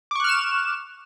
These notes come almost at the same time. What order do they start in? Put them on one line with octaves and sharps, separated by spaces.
D6 C#6 F#6 F6 E7